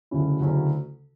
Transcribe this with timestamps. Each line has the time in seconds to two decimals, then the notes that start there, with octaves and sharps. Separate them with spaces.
0.11 D2 C#3 F#3 C#4 E4
0.40 D2 C#3 F#3 C#4 E4